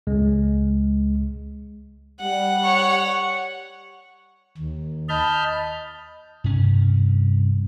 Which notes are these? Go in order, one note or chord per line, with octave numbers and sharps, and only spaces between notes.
C#2 G#3
G3 F#5
C#5 C#6
D#2
D#5 A5 B5 F6 G6
G2 C3 C#4